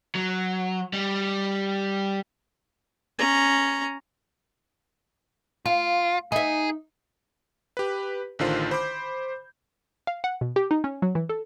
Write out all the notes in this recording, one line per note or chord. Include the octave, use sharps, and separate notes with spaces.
F#3
G3
C#4 A#5
F4 F5
D#4 G#4 E5
G4 B4
A1 D3 D#3 F4 C5
C5 B5 D6 G6
F5
F#5
B2
G4
D#4
C#4
F#3
E3
A4